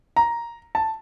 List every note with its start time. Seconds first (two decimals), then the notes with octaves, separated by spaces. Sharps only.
0.16 A#5
0.75 A5